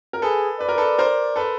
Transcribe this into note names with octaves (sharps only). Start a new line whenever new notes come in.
A#4
G#4 A4 B4
B4 D5
A#4
A4 B4
A#4 C5
A4 B4